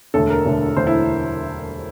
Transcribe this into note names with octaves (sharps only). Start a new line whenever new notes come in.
E1 D2 D3 A4
A#4
E1 D2 D3
E1 D2 D3 C5
E4